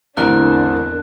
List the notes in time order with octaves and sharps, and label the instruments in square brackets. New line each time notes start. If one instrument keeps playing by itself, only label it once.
[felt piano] A1 C4 A#5 [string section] E2 D3 D4 [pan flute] A#4 [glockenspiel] F#6